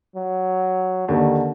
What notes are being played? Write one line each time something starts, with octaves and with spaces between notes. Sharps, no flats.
F#3
D#2 D3 D#3